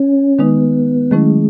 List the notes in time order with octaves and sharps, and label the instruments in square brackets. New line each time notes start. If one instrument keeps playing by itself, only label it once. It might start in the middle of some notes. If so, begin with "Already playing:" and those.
Already playing: [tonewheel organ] C#4
[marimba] D#3 G#3 D#4 [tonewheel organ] B3
[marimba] D#3 F#3 A3 C#4 E4 [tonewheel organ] G#3